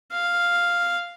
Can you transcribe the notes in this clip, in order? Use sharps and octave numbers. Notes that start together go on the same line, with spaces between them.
F5